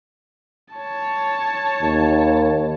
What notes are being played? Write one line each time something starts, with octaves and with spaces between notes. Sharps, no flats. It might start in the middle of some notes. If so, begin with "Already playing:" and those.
C#5 A5
D#2